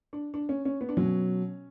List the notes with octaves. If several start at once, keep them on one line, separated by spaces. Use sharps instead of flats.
D4
D4
C#4
C#4
B3
D4
B2 F#3 C#4